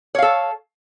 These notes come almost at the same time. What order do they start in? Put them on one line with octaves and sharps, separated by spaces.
C#5 F5 A4